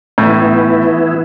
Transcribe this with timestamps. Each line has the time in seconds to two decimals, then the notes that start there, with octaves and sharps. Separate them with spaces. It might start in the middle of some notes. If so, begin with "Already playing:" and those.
0.18 A2 E3 B3 E4